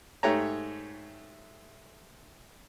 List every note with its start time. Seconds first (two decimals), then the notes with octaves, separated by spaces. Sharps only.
0.23 G#2 A3 G4 C#5 A#5